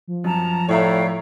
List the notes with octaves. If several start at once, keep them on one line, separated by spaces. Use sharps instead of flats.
F3
F#2 A5 A#5
A2 C#5 D5 E5 F5 G5 A#5